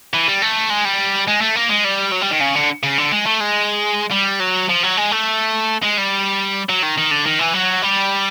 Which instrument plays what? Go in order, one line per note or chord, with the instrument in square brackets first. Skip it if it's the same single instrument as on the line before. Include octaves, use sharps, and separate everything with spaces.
[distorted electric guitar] E3
G3
A3
G#3
G3
G#3
A3
A#3
G#3
G3
F#3
G3
D#3
C#3
D3
C#3
D3
G#3
A3
G#3
G3
F#3
F3
F#3
G#3
A3
G#3
G3
F#3
D#3
D#3
D3
D#3
E3
F#3
G3